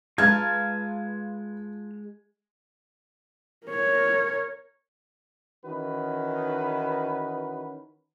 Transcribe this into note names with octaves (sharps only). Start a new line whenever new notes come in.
G#3 F4 B4 F5 A5 A#5 F6 G#6
A#4 C#5
D#3 E3 C#4 D#4 F#4 B4